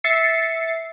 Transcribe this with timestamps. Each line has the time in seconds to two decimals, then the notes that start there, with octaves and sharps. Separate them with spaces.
0.04 E5 A6 C7 C#7